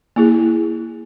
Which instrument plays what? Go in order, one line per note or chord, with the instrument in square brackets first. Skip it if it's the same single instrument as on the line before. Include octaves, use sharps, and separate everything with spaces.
[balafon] A#3 E4 G#4